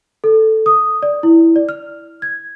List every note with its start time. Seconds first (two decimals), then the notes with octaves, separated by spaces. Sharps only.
0.24 A4
0.66 D#6
1.03 D5
1.23 E4
1.56 D5
1.69 F6
2.22 G#6